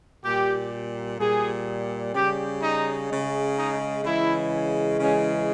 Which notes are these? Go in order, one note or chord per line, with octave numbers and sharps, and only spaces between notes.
A#2 G3 G4
A#2 G3 G#4
C#3 G3 G4
D#4
C#3 G#3
D#4
C#3 E3 G#3 E4
C#3 E3 G#3 C#4